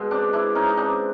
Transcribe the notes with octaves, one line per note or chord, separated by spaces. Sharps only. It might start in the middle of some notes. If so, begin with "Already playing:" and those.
Already playing: B2 G#3
C4 D4
D4 E4
C#4 D#4
D#4
C4 D4